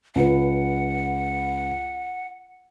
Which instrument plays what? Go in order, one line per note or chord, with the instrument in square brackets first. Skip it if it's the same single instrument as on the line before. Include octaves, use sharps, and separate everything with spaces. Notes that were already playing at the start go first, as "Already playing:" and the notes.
[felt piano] C#2 B4 [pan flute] F#5